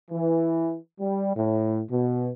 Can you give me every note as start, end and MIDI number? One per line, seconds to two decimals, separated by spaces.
0.11 0.77 52
1.00 1.34 55
1.35 1.80 45
1.90 2.29 47